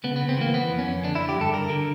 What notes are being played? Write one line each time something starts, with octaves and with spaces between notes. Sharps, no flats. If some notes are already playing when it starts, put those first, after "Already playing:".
C#3 B3
B3
C#3
C4
E3 A#3
E3 B3
F2
C#4
F2
D3 D4
E4
D3
G4
G2 A4
D3 A#4
D3